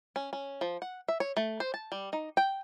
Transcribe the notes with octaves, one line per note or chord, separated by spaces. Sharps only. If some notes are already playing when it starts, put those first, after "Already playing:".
C#4
C#4
F3
F#5
E5
C#5
A3
C5
A5
G3
D#4
G5